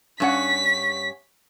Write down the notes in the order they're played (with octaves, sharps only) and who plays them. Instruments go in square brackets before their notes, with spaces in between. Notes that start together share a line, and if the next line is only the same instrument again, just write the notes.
[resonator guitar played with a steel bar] G2 C#4 F#5 [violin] B6